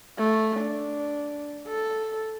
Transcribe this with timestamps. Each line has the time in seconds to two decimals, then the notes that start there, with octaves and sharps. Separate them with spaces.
0.18 A3
0.60 D4
1.68 A4